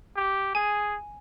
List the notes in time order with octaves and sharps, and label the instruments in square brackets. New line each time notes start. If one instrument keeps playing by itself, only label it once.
[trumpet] G4
[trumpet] G#4 [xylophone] G#5